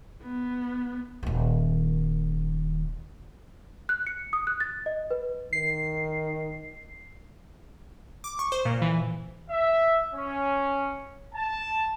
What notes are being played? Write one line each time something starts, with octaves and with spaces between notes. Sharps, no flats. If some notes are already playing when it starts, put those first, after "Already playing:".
B3
D#1 D#3
F#6
C#7
D#6
F#6
A6
D#5
B4
D#3 C7
D6
C#6
C5
A#2
E3
E5
C#4
A5